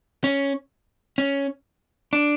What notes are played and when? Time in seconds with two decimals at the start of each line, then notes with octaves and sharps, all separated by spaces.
0.24 C#4
1.18 C#4
2.13 D4